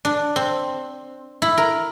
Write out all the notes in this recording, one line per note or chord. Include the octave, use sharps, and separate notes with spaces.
D4
C4
E4
A#4